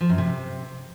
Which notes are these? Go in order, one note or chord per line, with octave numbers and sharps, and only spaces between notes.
F3
F#2
C3